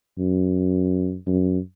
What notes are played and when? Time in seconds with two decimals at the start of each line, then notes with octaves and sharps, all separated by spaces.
0.18 F#2
1.26 F#2